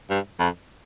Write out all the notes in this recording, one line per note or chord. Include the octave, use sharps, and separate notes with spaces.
G2
F2